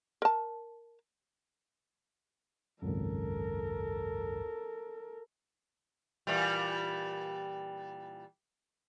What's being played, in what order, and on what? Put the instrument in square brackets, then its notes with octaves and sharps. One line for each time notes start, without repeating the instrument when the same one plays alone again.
[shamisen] A#4 A5
[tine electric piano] G#1 C#2 F#2 [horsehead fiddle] A4 A#4
[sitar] A#2 E3 G3